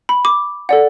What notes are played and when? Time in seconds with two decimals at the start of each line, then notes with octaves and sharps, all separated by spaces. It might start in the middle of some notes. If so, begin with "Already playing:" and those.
0.09 B5
0.25 D6
0.69 A4 D5 F#5